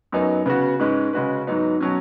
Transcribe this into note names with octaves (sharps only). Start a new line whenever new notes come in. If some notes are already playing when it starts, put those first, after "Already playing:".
F#2 F#3 B3 D#4
C#3 B3 F#4
G#2 G#3 C#4 B4
C#3 G#3 C#4 F#4 B4
G#2 F#3 B3 D#4
B2 F#3 C#4